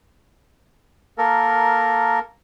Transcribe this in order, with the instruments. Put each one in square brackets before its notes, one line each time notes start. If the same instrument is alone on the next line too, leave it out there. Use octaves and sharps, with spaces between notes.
[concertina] A#3 A4 A#4